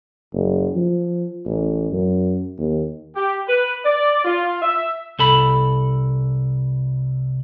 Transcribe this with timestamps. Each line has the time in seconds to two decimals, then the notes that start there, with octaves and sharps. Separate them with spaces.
0.33 F#1
0.75 F3
1.45 A1
1.92 F#2
2.58 D#2
3.16 G4
3.48 B4
3.85 D5
4.25 F4
4.62 E5
5.19 C2 A4 B5